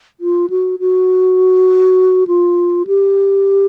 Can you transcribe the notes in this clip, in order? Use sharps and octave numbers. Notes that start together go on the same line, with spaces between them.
F4
F#4
F#4
F4
G4